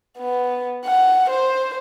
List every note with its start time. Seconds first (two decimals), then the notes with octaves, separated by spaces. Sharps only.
0.19 B3
0.85 F#5
1.30 C5